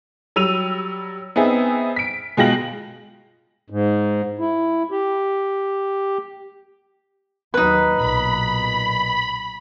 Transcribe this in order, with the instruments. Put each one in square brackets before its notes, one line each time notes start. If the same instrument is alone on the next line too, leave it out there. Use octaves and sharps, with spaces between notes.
[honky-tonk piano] F#3 G3 E6 D#7 F7
B3 C4 D#4 G#4 E5
B6 D7
B2 G#3 F4 G5 A#6 F#7
[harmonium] G#2
E4
G4
[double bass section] D#2 F#3 [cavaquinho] D#4 B4
[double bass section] B1 A#2 [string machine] B5